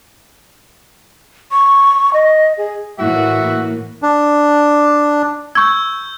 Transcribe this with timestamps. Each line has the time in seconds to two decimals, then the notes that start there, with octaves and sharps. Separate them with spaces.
1.52 C#6
2.13 D#5
2.58 G#4
2.99 A2 E3 A#3 E4 F#4 E5
4.03 D4
5.55 C#6 E6 G6 G#6